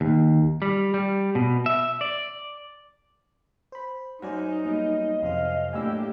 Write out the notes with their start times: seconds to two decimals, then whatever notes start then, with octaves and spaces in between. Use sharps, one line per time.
0.01 D#2
0.62 G3
0.94 G3
1.35 B2
1.66 E5
2.01 D5
3.72 C5 B5
4.22 F#2 D#4 C5 D5 F#5 G#5
4.65 G3 A#3 B3 D#5
5.23 F2 C3 C5 F5
5.73 A2 A#3 D4 E4 G4 G#5 E6